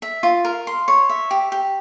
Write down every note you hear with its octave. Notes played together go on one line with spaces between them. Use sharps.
E5
F4
A#4
C6
C#5
E5
G4
G4